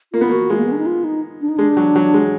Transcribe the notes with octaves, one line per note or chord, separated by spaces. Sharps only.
A#3 F4
B3
A#3 F#4
G#3 F4
A#3
B3
D4
D#4
F4
D#4
D4
D#4
G#3 D4
F#3
F#3
G#3